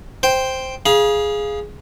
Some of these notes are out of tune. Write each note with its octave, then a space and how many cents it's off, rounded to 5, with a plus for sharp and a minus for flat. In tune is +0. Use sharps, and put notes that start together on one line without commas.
C5 +0 G5 +0
G#4 +0 F5 +0 B5 -45